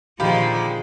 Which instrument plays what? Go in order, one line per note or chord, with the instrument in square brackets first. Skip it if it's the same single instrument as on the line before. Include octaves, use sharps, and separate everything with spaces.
[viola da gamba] A#2 D3 F3 [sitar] D#3 G#3 [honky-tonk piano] F4 G4 B5